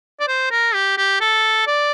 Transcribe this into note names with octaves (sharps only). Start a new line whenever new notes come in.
D5
C5
A#4
G4
G4
A4
D5